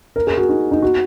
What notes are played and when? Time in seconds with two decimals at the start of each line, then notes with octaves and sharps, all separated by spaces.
0.16 A#4
0.27 G#4
0.37 F#4
0.49 D#4
0.71 D#4
0.82 F#4